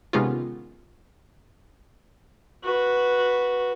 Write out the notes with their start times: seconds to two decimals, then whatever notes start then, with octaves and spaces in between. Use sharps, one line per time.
0.13 C3 D#3 G#3 B3 C#4 F4
2.64 F#4 B4